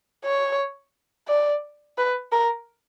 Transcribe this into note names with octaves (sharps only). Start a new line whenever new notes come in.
C#5
D5
B4
A#4